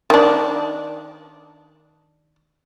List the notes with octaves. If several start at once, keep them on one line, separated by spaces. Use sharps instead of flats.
D#3 D4